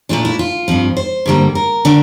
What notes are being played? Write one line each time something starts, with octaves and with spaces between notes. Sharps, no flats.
A#2 A3 D4 F4
E4
F4
G2 F3 C4
C5
G2 D3 G3 A#3
A#4
D3 A3 D4